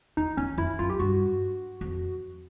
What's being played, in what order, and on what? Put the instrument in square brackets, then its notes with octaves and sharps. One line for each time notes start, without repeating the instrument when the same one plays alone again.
[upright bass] E2 [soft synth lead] D#4
[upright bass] E2 [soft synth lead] C#4
[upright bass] F2 [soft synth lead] E4
[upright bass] F#2 [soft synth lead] F4
[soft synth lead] G4
[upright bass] G2 [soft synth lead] F#4
[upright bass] F2